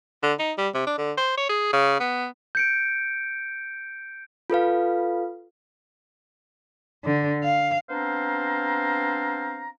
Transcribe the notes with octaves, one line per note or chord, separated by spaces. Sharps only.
D3
D#4
G3
C3
D4
D3
C5
C#5
G#4
C#3
B3
G6 C#7 D7
F4 A4 B4 F5
D3
F5
B3 C4 D4 C5 F5 A#5